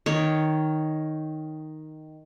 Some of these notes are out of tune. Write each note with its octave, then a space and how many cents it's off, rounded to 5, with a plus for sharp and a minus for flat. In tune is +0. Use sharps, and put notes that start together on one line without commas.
D#3 +0 C#5 +0